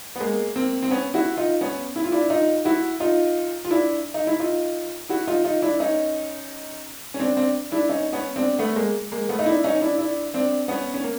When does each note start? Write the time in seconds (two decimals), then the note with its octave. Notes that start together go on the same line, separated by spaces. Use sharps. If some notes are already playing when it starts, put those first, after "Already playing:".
0.16 B3
0.20 G#3 A#3
0.56 A#3 C4
0.82 C4
0.91 B3 C#4
1.14 E4 F#4
1.37 D#4 F4
1.61 B3 C#4
1.96 E4
2.04 F4
2.12 D4 E4
2.30 D#4 F4
2.65 E4 F#4
3.00 D#4 F4
3.65 F4
3.71 D4 E4
4.14 D#4
4.27 E4
4.40 D#4 F4
5.09 E4 F#4
5.27 D#4 F4
5.44 D#4 F4
5.62 D4 E4
5.80 C#4 D#4
7.14 C#4
7.20 C4 D4
7.37 C4 D4
7.72 D4 E4
7.89 C#4 D#4
8.13 B3 C#4
8.36 C4 D4
8.59 A3 B3
8.76 G#3 A#3
9.12 G#3 A#3
9.29 A3 B3
9.39 D#4
9.46 D4 E4
9.64 C#4 D#4
9.81 D4 E4
9.99 D4 E4
10.34 C4 D4
10.68 B3 C#4
10.94 C#4
11.04 A#3